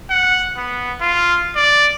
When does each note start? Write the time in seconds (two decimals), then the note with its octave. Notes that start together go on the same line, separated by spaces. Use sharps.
0.10 F#5
0.57 B3
1.01 F4
1.56 D5